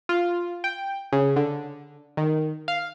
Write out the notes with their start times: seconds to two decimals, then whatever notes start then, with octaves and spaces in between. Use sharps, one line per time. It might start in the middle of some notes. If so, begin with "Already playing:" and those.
0.09 F4
0.64 G5
1.13 C#3
1.36 D3
2.17 D#3
2.68 F5